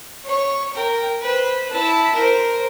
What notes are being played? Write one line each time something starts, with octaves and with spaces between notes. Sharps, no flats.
C#5 C#6
A#4 G5
B4 C5
E4 A5
A#4 C5